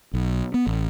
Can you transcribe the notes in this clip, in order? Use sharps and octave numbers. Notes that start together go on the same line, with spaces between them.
B1
B3
A1